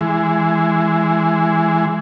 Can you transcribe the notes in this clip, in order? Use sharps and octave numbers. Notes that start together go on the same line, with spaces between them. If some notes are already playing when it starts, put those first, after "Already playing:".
E3 G#3